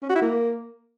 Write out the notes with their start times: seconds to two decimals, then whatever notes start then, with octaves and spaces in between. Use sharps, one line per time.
0.03 C#4
0.09 F#4
0.15 E4
0.22 A#3